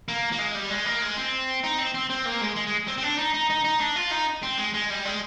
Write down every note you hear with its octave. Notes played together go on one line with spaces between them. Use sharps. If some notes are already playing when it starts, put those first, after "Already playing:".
A#3
A#3
G#3
G3
G#3
A#3
G#3
C4
D#4
C4
C4
C4
A#3
G#3
G#3
G#3
C4
C4
D4
D#4
D#4
D#4
D#4
D4
F4
D#4
C4
G#3
G#3
G3
G#3